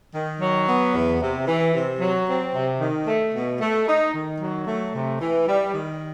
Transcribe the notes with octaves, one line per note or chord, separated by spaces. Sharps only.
D#3
F#3
B3
E2
C3
E3
C3
F#3
C4
C3
D#3
A3
B2
A3
D#4
D#3
F#3
A3
C3
E3
G3
D#3